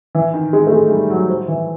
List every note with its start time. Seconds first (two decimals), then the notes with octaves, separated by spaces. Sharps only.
0.15 E3
0.34 D#3
0.53 G#3
0.67 A3
0.72 G#3
0.91 G3
1.10 F#3
1.29 F3
1.48 E3